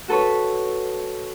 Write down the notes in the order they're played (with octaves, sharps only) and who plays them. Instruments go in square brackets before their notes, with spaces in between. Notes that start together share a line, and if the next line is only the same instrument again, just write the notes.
[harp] F#4 A4 B4 C#5